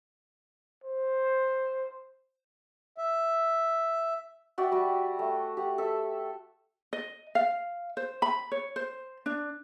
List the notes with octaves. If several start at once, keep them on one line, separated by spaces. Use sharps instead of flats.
C5
E5
F#4 D5 E5 G5
G3 F#4 G4
A3
G4 F#5
A4 E5
D#5
F5
C5
B5
C#5
C5
D4